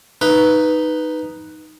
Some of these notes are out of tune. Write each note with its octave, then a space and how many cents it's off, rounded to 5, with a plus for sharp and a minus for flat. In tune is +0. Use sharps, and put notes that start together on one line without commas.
D#4 +0 B4 +0